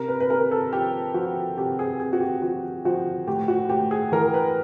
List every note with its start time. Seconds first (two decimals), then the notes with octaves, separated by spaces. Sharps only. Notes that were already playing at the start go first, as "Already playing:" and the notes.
Already playing: C3 A#4
0.08 B4
0.20 B4
0.30 C3 A#4
0.51 A4
0.72 F3 G4
1.14 F3 F#4
1.57 C3 G4
1.79 G#4
2.00 C3 G#4
2.13 F#4
2.21 G4
2.42 F3 F#4
2.85 F3 F#4
3.27 A2 G4
3.48 F#4
3.69 A2 G4
3.91 G#4
4.12 E3 A#4
4.34 B4